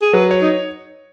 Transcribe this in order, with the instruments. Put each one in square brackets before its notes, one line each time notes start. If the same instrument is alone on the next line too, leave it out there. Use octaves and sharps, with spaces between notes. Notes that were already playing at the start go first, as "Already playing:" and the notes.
[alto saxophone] G#4
[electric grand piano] F#3 [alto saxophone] B4
[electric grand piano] C#5
[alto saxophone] D#4